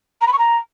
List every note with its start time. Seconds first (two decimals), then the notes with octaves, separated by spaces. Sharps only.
0.21 A#5
0.26 B5
0.32 C#6
0.38 A#5